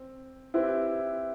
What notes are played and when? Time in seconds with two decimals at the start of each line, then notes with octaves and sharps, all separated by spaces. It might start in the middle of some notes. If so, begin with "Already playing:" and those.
Already playing: C4
0.54 C4 E4 G4 B4